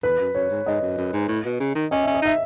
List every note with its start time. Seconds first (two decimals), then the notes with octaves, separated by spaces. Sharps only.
0.03 E2 B4
0.19 F#2
0.35 F#2 C#5
0.51 G#2
0.66 G#2 D#5
0.82 F#2
0.98 F#2
1.13 G#2
1.28 A2
1.45 B2
1.60 C#3
1.75 D#3
1.91 C#4 D#5
2.03 C#4 E5
2.14 D#5
2.22 D#4 E5